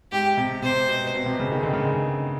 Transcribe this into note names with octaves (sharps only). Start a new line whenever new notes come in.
G#2 G4
C3
C3 C5
B2
B2
C3
C#3
D#3
D3
C#3
D3